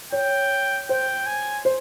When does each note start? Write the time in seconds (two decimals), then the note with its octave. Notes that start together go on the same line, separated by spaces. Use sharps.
0.12 C#5 G5
0.89 C5 G5
1.26 G#5
1.65 C5